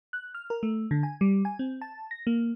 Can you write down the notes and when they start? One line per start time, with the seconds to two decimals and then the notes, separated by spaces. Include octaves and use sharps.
0.13 F#6
0.35 F6
0.50 A#4
0.63 A3
0.91 D3
1.03 G#5
1.21 G3
1.45 G#5
1.59 C4
1.81 A5
2.11 A#6
2.27 A#3